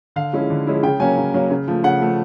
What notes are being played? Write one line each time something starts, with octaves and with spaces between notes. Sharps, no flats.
D3 F5
F3 G#3 C#4 E4
D3
F3 G#3 C#4 E4
C#3 G5
F#3 A#3 C#4 G#5
C#3
F#3 A#3 C#4
C#3
F3 A3
C#3 F#5
F3 A3